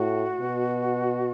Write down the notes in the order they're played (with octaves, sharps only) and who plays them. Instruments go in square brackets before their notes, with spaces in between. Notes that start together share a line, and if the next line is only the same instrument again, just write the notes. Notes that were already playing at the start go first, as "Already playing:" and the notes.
Already playing: [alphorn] A2 [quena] F#4
[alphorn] B2